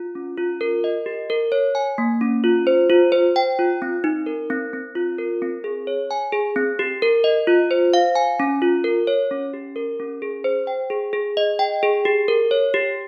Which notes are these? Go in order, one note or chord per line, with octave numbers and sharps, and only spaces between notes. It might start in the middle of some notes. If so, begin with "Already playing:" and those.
Already playing: F4
C#4
F4
A#4
D#5
G4
A#4
C#5
G#5
A#3
C#4
F4
C5
F4
C5
G5
F4
C4
D#4
A#4
C4
C4
F4
A#4
C4
G#4
C#5
G#5
G#4
C4
G4
A#4
D#5
F4
C5
F5
G#5
C#4
F4
A#4
C#5
C#4
G4
A#4
C#4
G#4
C5
G5
G#4
G#4
D#5
G5
G#4
G4
A#4
C#5
G4